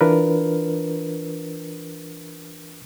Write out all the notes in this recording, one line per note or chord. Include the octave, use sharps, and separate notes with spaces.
E3 D4 F4 A#4 B4